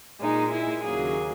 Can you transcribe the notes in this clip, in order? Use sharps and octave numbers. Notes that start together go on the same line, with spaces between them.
A#2 G#3 D#4
E4
D#2 C#3 F#3 A#3 G#4